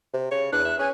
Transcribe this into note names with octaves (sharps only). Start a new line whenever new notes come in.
C3
C#3 C#5
E2 D4 F#6
E5
C#4 G#4 G#5